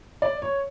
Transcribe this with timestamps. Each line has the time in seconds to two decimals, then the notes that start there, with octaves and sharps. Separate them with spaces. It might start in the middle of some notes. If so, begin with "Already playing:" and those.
0.22 D5
0.42 C#5